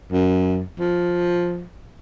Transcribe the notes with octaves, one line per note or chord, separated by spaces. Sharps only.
F#2
F3